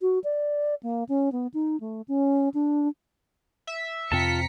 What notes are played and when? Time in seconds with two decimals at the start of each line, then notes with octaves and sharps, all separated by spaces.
0.01 F#4
0.24 D5
0.83 A#3
1.09 C#4
1.32 B3
1.54 D#4
1.80 A3
2.08 C#4
2.54 D4
3.67 E5
4.12 F2 C3 C4 F4 A5 A#5 B6 C#7